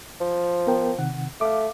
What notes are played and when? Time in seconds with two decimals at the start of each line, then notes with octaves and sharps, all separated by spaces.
0.21 F3
0.67 B3 A#4 G5
0.98 C3 D#3 F#5
1.41 A3 F5 D6